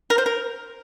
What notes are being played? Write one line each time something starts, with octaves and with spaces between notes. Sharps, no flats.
A#4
C5
A#4